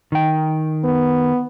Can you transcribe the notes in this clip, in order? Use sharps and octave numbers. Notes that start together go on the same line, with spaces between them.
D#3 G5
B3